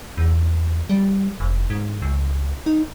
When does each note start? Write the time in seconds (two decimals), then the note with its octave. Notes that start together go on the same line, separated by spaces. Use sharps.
0.17 E2
0.90 G3
1.40 F1
1.70 G#2
2.02 C#2
2.66 D#4